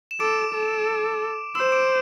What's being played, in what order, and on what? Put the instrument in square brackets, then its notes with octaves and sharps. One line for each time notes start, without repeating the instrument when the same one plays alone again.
[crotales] E7
[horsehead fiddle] A4 [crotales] D6 D7
[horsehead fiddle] A4
[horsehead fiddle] C5 [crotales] E6 E7
[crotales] D6 D7